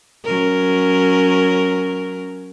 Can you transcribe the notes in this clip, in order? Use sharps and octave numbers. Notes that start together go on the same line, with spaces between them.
F#3 C#4 A#4